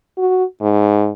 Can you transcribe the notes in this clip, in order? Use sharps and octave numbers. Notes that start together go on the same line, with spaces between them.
F#4
G#2